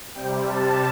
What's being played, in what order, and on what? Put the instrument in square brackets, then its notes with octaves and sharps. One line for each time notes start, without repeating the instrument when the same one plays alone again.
[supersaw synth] C3 G3 G5
A5